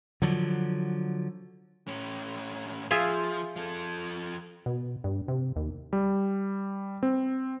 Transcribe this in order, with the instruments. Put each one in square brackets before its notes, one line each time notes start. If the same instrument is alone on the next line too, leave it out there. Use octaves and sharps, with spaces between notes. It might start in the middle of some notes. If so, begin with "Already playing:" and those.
[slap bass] D3 F3 F#3
[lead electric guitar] A2 C#4
[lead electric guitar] F3 [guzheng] F4 G#4 E5
[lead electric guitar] F3 A4
[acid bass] B2
G2
C3
D#2
[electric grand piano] G3
C4